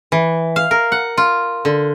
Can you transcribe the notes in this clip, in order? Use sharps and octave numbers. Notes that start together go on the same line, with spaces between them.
E3
F5
A#4
F#5
F4
D3